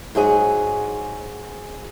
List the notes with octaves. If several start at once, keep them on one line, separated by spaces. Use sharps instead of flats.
G#2 F#3 G#4 G#5